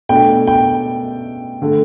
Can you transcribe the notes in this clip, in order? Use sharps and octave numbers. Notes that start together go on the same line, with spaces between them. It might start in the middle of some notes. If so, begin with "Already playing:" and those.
B2 A3 D4 G5
G5
D3 A3